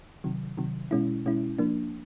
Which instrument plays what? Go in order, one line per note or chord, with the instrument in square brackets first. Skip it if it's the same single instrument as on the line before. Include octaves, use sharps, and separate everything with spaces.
[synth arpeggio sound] C3 D#3 F#3
C3 D#3 F#3
B2 G#3 C#4 E4
B2 G#3 C#4 E4
F3 A#3 D4